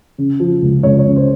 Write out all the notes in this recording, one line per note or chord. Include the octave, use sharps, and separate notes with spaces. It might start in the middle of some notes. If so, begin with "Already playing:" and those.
C#3
F3
C#2
C#2 C#5
C#5
C#3
C5